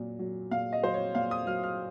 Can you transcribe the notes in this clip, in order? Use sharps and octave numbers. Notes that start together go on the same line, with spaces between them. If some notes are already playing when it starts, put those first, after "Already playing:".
Already playing: A#2 F#3
F#3
A#2 F5
D#5
F#3 C5
C#5
A#2 F5
D#6
F#3 F6
F6